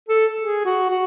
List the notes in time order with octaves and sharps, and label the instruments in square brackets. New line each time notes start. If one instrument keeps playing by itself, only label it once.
[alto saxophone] A4
G#4
F#4
F#4